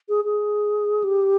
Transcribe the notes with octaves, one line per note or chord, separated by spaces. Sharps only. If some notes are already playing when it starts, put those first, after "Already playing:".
G#4
G#4
G4